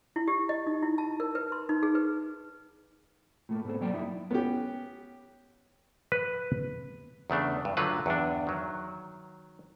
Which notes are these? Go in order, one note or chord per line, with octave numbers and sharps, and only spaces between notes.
E4
G4
D#5
D#4
E4
A5
A#4
B4
C6
D#4
G#4
B4
A2 A3 A#3
G#2 B3 C4 A4
B1 F#3 A#3 D5 G5
F#2 D#4 E4
B3 C#4 G4
B4
E2 C#3 A3 D4
G2
D3 F#3 A3 F4 B4
E2 G2 D4
D#3 F#3